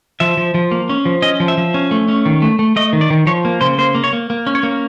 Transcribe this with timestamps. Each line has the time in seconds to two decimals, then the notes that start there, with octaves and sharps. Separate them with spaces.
0.20 F3 E5
0.37 F3
0.54 F3
0.71 A#3
0.89 C#4
1.05 F3
1.22 C#4 D#5
1.40 F3
1.48 E5
1.58 F3
1.74 C#4
1.91 A3
2.08 C#4
2.26 D#3
2.42 A3
2.59 A3
2.76 A3 D#5
2.93 D#3
3.01 D5
3.10 D#3
3.27 F3 C#5
3.45 A#3
3.61 C#3 C5
3.78 A#3 C5
3.95 A#3
4.04 C#5
4.13 A#3
4.30 A#3
4.47 C#4
4.55 C#5
4.63 A#3